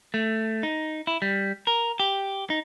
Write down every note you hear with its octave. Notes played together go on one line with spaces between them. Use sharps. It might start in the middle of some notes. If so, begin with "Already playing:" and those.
A3
D#4
E4
G3
A#4
G4
D#4